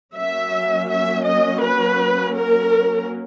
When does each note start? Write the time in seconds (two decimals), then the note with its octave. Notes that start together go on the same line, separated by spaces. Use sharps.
0.15 F#3 A#3 C#4 E5
0.89 E5
1.26 D#5
1.62 B4
2.36 A#4